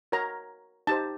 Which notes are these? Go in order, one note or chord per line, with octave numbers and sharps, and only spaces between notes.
F#4 A#4 C#5 A#5
D#4 G4 C5 A5